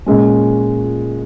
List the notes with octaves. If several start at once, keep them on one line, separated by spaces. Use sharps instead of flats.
A#2 G#3 C#4